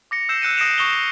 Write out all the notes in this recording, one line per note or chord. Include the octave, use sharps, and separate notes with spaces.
D6 A#6 C#7
E6 G6 C7 E7
E6 F#6 C#7 D#7
D#6 A#6 C7 D7 E7 F7
C#6 D#6 A#6 F7 G7
C7